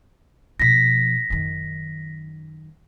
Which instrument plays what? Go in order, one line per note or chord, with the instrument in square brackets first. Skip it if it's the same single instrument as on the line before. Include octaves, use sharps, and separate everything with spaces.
[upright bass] B2 F3 [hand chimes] A#6 B6
[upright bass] F#2 D#3